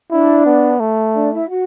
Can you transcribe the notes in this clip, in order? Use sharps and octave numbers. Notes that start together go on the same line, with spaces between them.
D4 E4 D5
B3
A3
D4 D5
E4 E5
F#4 F#5